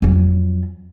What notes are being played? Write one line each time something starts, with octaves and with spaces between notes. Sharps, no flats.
F2 F#3